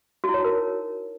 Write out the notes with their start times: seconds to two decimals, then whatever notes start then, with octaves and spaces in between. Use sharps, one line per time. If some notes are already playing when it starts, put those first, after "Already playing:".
0.24 F#4
0.29 E4
0.34 C#5
0.39 D#4
0.44 A#4